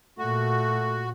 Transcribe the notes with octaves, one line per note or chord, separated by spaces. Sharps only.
A#2 A3 F#4